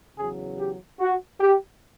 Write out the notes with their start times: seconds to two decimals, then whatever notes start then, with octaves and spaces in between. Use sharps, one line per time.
0.18 E2 C#3 F#3 G#4
0.59 G4
1.00 F#4
1.41 G4